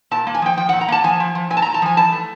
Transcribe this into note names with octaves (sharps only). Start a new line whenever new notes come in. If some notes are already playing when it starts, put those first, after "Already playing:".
A#2 A5
A#3
G#5
F3 G5
F3 G5
A#2 F#5
A#5
A#3 A5
F3 G#5
F3
F3
A#2 G#5
A5
A#2 A#5
A5
F3 G#5
E3 A5
A3